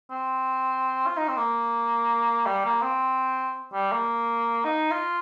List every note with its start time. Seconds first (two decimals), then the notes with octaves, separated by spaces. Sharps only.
0.11 C4
1.07 F4
1.17 D#4
1.28 C4
1.37 A#3
2.46 G3
2.65 A#3
2.82 C4
3.73 G3
3.92 A#3
4.65 D#4
4.91 F4